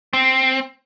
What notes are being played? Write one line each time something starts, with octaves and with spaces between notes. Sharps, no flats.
C4